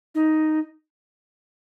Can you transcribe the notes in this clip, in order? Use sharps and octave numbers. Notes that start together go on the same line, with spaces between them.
D#4